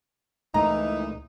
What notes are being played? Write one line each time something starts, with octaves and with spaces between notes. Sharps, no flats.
C#2 A#2 E3 A3 D#4 A#5